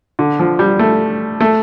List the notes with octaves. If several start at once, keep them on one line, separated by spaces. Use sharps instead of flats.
D3
F3
G3
A3
A3